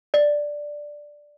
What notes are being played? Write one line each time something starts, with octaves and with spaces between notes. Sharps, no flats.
D5